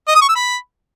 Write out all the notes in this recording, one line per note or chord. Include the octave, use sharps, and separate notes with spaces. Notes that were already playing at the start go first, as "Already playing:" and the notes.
D#5
D#6
C#6
E6
B5